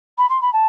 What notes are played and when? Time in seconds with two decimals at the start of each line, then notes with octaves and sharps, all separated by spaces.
0.18 B5
0.29 C6
0.41 B5
0.53 A5